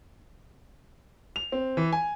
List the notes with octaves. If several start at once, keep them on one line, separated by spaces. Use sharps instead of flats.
F7
C4
E3
G#5